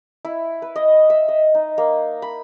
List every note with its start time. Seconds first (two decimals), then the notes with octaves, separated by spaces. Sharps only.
0.25 E4
0.62 B4
0.76 D#5
1.10 E5
1.28 D#5
1.55 D#4
1.78 A#3
2.22 B5